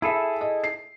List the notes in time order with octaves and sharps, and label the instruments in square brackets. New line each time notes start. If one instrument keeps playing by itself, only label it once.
[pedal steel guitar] E4 G#4 A4 [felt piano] E5 B5
[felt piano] D#5
C7